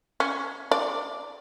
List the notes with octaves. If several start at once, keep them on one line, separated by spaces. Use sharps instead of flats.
C#4
D5